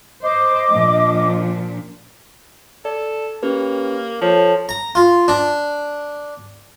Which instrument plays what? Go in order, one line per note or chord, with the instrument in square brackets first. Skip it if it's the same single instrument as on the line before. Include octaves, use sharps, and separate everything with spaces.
[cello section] C5 [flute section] D#5 D6
[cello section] A#2 F3 D4
[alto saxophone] A4 [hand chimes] D5
[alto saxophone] A#3 [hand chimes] C#4 G4 B4
[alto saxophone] F3 [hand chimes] A4 C#5 A5
[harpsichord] A#5
F4
D4